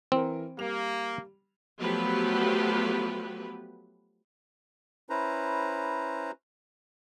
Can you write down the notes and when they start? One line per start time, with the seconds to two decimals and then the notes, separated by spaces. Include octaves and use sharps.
0.12 E3 C4 A#4
0.58 G3 A#3 F7
1.80 F3 F#3 A3 B3 G4 B4
5.10 C#4 E4 B4 C5 A#5